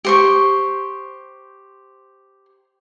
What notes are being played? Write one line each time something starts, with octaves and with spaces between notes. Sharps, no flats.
G4 C5 C#6